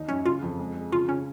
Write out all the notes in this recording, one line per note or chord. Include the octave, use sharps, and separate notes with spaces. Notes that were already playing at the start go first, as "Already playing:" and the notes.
Already playing: D#2 D#4
F#2 C#4
C#3 F4
F2
G#3
G#3
C#3 F4
C#3 C#4